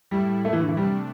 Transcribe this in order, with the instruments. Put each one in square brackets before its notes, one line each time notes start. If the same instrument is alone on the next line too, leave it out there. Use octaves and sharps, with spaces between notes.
[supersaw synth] A2 A3 E4 [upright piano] G3
[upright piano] A3
E3
D3
E3
[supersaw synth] C3 A3 D4 [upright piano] G3